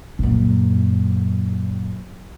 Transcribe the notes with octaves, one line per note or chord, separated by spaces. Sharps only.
F#2 A#2